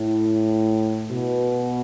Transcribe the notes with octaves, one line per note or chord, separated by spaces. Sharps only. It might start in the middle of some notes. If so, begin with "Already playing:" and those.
Already playing: A2
B2